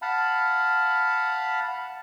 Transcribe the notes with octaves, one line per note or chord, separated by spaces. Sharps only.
F5 F#5 A5 B5